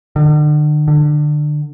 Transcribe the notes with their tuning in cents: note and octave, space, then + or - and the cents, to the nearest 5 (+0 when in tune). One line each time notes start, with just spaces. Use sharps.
D3 +40
D3 +25